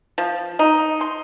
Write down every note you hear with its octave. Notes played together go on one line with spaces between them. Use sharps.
F3
D#4
C6